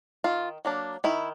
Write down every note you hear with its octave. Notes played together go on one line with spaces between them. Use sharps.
D#3 F4
F#3 A#3 D4
D#3 E4